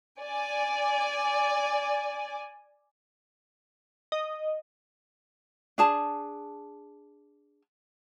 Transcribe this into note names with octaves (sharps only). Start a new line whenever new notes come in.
D5 G#5
D#5
D4 G#4 A5